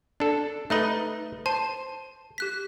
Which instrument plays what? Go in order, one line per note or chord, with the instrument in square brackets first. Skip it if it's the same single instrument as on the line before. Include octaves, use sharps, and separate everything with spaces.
[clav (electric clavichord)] D4 A4
[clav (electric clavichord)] A3 D#4 D#5 [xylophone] B4 B5 F#6
[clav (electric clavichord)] C5 [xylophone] A5
[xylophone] G4 F#6 B6